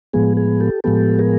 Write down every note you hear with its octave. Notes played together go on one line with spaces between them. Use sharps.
A2 F3 G#3 B3 G#4
G#4
G4 A4
A2 F3 G#3 B3 G4 A4
G#4 A#4